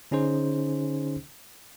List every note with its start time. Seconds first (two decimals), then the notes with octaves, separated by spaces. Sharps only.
0.11 D3 C#4 D#4 G#4 C5